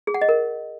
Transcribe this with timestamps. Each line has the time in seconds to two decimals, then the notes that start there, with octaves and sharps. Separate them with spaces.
0.07 G#4
0.14 F#5
0.22 D#5
0.29 A#4